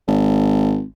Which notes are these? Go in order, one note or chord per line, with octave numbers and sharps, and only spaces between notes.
G#1